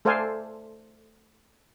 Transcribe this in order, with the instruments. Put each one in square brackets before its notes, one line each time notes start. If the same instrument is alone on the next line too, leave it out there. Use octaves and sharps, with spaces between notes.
[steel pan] A3 A4 C5 D5 F5 G#5